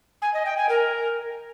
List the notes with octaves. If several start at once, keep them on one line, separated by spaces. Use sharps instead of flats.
G#5
D#5
G5
G#5
A#4